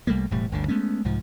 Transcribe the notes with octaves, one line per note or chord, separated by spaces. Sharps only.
C2 G3 A3 A#3
E1 A2 G3
G1 D2 D3
G#3 A3 B3 C#4
C2 G#2 F3